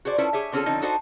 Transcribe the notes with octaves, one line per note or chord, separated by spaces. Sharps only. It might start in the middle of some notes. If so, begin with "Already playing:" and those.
F#4 G#4 C5 D5
C#4 E4 F4 A4 B4 C5
G4 G#4 C#5 E5
D3 C4 C#4 F4 G#4 A4
D3 F3 C4 C#4 D#4
D4 D#4 F#4 A4 C5 D#5